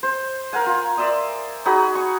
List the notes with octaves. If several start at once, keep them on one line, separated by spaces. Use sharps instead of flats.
C5
A#4 F5 F#5 G#5
F4
D5 E5 C6 D#6
D#4 F#4 G#4 B5
C#6